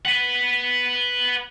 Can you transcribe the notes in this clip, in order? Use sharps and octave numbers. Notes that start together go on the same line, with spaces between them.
B4 F#5